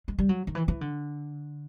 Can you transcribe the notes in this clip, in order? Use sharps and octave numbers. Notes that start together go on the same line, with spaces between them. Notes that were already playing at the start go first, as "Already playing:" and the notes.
G#3
G3
F#3
D#3
E3
E3
D3